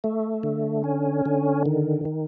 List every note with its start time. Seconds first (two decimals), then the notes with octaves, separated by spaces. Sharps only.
0.04 A3
0.43 D3
0.84 C#4
1.26 D3
1.66 D#3
2.05 D#3